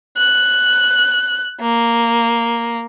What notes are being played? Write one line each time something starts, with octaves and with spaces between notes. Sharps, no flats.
F#6
A#3